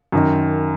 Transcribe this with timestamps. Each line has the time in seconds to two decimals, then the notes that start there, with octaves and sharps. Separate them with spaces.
0.12 F#2 D#3